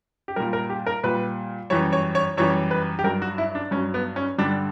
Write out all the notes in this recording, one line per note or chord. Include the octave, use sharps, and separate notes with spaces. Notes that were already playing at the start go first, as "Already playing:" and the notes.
G4
A#2 G3 A#4
A#4
G4
A#4
A#2 G3 B4
F#2 E3 G3 C#5
C#5
C#5
F#2 E3 G3 C#5
B4
G4
G2 F#3 A#4
F#4
E4
D4
G2 C#4
F#3
B3
C#4
G2 D3 G3 D4